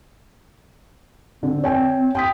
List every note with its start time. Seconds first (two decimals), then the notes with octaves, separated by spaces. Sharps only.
1.43 D3 C4
1.64 C#5 G5 G#5
2.15 G5 D#6 B6